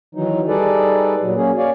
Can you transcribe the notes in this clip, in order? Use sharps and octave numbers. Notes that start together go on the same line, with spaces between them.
D#3 E3 F#3 D#4
G3 D#4 G#4 A4 B4 D5
A#2 F#3
F#3 A#3 C#4 G#4
C#5 D5 F5 G#5